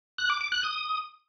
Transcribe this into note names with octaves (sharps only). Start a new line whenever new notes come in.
F#6
D6
D6
F#6
D#6